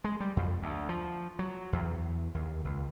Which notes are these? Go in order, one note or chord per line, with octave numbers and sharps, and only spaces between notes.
G#3
G3
F2
D2
F3
F#3
E2
D#2
C#2